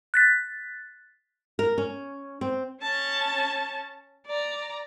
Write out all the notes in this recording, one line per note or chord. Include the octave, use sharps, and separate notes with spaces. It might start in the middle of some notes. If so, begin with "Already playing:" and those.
F#6 A6 B6
A#4
C#4
C4
C#4 A5
D5 A#5